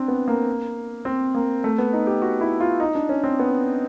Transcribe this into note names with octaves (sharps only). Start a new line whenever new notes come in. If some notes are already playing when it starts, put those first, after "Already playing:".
Already playing: C4 D4
B3
A#3
C4
A#3
A3
B3
D#4
G4
F#4
E4
F4
D#4
D4
C#4
C4
B3